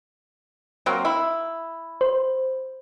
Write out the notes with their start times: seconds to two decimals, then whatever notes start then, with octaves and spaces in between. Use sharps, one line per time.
0.86 F#3 A#3 C4
1.05 E4
2.01 C5